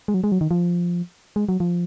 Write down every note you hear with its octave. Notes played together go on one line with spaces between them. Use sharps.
G#3
F#3
G#3
F#3
D#3
F3
G#3
F#3
F3